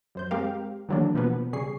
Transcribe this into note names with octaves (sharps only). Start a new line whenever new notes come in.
F#2 C5 G6
G#3 C4 G4 A#4 F5
D#3 E3 F#3 G#3 A#3 D4
B2 F3 A#3 B3
C#3 G3 G#4 C#6 C7